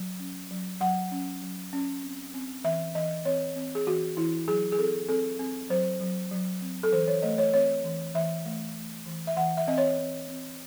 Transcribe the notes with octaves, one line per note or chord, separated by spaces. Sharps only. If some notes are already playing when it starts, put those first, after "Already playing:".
Already playing: F#3
C#4
F#3
F#3 F#5
C#4
F#3
C#4
C4
C4
E3 E5
E3 D#5
C4 C#5
C4
G#4
E3 F#4
E3 E4
F#3 G#4
G#4
C4 A4
C4 A4
C4
F#3 C5
F#3
F#3
C4
A4
E3 C5
C#5
A3 D#5
C#5
C4 C#5
E3
E3 E5
A3
A3
E3
E5
E3 F#5
E5
C4 D#5
C#5
C4
C4